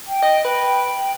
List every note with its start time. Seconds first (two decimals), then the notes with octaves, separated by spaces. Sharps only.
0.07 G5
0.22 D#5
0.45 B4